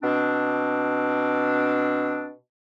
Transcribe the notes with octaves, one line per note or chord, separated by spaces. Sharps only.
B2 C4 D4